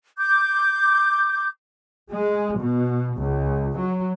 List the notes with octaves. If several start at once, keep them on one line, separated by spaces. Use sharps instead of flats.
D6 G6
G#3
B2
C#2
F#3